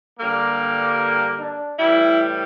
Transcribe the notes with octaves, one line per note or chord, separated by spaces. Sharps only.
G2 D3 G3 A#3
D4
A2 E3 G3 E4